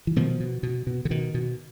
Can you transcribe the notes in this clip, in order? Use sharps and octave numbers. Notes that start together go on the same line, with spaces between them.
E3
B2 D#3 F3
B2
B2
B2
D3
B2 D#3
B2